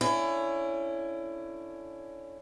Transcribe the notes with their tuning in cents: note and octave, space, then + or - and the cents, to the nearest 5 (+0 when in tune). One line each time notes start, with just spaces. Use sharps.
D3 +0 C#4 +0 E4 +20